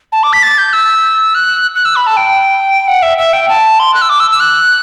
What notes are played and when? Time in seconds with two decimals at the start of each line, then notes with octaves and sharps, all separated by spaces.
0.12 A5
0.23 D6
0.33 B6
0.43 A6
0.58 G6
0.73 E6
1.35 F#6
1.76 F#6
1.85 E6
1.96 B5
2.07 A5
2.17 G5
2.88 F#5
3.02 E5
3.18 E5
3.33 G5
3.49 A5
3.79 C6
3.94 F#6
4.02 E6
4.09 D6
4.20 E6
4.31 E6
4.40 F#6